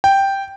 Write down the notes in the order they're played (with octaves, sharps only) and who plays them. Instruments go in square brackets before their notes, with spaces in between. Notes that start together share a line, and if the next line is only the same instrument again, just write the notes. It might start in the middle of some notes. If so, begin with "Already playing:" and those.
[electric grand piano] G5